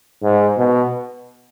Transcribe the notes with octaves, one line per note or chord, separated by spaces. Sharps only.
G#2
B2